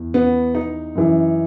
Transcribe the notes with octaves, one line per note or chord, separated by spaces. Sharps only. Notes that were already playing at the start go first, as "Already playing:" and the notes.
Already playing: E2
B3
D#4
F#2 E3